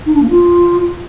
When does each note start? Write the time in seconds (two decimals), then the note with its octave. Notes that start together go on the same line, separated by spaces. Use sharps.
0.06 D#4
0.14 D4
0.22 A#3
0.30 F4